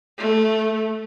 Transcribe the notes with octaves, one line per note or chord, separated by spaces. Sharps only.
A3